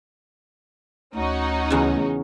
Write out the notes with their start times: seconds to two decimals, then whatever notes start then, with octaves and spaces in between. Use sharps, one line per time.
1.15 D2 C#4 D#4 F#4
1.70 E2 C#3